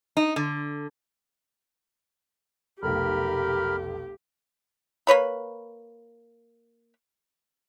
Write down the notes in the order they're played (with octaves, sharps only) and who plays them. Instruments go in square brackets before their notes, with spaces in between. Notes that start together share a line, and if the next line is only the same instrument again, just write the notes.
[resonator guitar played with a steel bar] D#4
D3
[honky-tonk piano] F1 B1 [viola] G4 [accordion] A#4 B5 F6
[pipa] A#3 B4 C#5 B5